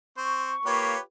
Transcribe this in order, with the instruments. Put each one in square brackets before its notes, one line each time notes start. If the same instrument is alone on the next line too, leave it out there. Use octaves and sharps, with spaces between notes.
[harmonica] C4 C5 [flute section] C#6
[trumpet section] A#3 C#5 [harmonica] F4 G4 B4